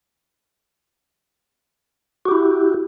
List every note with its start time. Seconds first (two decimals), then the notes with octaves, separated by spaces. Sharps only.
2.26 F#4
2.28 G4
2.31 E4